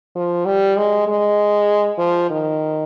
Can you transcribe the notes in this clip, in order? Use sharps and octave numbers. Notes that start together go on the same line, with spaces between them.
F3
G3
G#3
G#3
F3
D#3